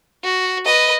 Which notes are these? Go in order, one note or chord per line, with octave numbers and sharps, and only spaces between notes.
F#4
B4 D#5